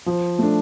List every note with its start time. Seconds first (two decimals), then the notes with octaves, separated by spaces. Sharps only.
0.06 F3
0.39 A3 D4